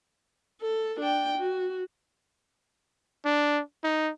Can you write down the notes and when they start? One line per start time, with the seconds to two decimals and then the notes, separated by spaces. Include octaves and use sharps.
0.62 A4
1.00 D4 G5
1.38 F#4
3.25 D4
3.84 D#4